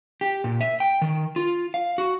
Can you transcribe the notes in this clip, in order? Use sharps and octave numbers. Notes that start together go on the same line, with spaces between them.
G4
A#2
E5
G5
D#3
F4
F5
F#4